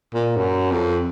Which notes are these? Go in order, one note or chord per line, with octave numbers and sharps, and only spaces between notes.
A#2
F#2
F2